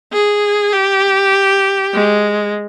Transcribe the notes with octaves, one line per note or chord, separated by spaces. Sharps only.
G#4
G4
G#3